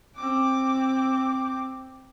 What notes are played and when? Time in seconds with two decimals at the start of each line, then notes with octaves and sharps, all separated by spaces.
0.16 C4 D6